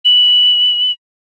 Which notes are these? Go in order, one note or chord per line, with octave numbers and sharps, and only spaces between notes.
F#7